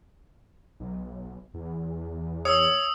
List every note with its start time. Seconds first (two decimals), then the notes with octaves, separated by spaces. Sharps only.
0.80 B1
1.54 E2
2.45 C#5 D#6 E6